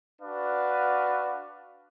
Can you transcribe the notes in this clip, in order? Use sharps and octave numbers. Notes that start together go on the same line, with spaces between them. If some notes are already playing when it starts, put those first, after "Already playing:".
D4 F#4 B4 F5